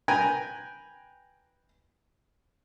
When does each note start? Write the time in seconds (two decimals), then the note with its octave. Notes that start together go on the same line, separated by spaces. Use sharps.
0.08 B4 G5 G#5 A#5